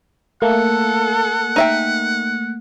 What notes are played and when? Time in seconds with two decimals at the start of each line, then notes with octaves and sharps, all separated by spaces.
0.42 A3 A#3 A4 F#5
1.56 D#4 E5 G5